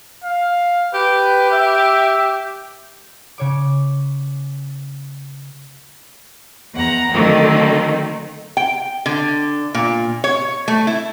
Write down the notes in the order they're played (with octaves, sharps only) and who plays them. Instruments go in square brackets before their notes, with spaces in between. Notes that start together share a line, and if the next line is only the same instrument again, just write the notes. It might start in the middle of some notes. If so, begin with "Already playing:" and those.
[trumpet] F5
[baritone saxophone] G4 [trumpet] B4
[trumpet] E5
[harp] C#3 C#5 D6
[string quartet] E2 F#5 A#5
D3 D#3 F#3 A3 A#3 C4
[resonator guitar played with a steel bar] G5
D3
A#2
C#5
A3
E4